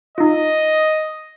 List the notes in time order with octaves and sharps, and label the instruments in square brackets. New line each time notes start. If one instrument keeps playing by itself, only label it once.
[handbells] D#4 F4 [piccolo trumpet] D#5